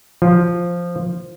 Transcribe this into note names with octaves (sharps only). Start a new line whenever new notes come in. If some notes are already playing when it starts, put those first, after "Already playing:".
F3